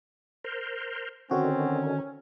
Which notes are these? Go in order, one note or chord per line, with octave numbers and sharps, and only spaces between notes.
A#4 C5
D3 D#3 C4 C#4 F#4